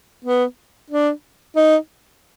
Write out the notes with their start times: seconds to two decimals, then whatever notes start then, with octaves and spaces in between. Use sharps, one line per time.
0.25 B3
0.90 D4
1.56 D#4